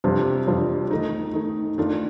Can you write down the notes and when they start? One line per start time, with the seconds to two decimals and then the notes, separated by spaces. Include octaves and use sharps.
0.04 F2 C3 G3 D4 F4
0.47 F2 C3 G3 D4 F4
0.91 D#3 A3 D#4
1.34 D#3 A3 D#4
1.78 D#3 A3 D4 F4